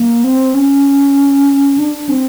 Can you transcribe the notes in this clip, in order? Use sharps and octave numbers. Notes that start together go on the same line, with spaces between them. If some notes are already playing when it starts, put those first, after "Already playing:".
Already playing: A#3
C4
C#4
D4
C4